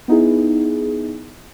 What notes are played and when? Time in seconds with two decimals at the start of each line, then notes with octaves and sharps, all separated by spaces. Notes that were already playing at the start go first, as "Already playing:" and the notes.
0.08 B3 D#4 E4 G#4